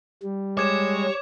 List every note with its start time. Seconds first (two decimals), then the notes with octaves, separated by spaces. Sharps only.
0.23 G3
0.57 G#3 C#5 D6 G#6 E7